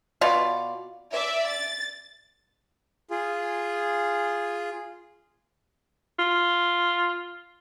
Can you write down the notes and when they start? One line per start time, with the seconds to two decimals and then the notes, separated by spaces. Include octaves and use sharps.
0.21 B2 F4 D5
1.12 D5 E5
1.48 A6
3.11 F4 G#4
6.19 F4